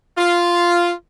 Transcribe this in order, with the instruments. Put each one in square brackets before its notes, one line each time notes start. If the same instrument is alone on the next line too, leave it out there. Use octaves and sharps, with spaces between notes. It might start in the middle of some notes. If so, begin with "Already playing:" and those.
[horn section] F4